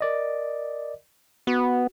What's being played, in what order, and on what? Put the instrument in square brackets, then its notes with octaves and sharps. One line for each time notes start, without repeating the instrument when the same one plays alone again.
[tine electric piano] A#4 D5 D#5
[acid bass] B3 [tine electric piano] F#4